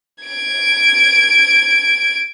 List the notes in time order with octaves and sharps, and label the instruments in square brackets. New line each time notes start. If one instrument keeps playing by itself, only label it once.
[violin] G#6 D7